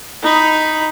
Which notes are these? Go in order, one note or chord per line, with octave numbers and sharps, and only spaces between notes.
D#4 B5